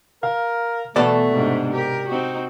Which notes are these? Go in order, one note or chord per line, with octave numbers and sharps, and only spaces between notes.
A#4 F5
B2 E3 A3 B3 A4 D5
G#2 C3 D4
G4 A#4
C4 D#4 F#4